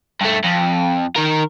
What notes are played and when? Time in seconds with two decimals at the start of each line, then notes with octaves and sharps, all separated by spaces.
0.21 G2 A3
0.44 F2
1.16 D#3 A#4